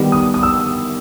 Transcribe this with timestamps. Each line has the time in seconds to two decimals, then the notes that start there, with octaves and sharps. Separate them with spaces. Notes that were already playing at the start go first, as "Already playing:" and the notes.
Already playing: D#3 G3 B3
0.12 D#6
0.34 D#6
0.43 E6